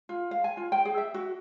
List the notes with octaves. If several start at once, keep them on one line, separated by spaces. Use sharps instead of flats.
F4
F5
G#5
F4
G5
G#4
E5
F#4